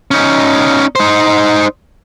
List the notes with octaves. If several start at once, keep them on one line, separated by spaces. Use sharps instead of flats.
C#4 D#4
D#4 C5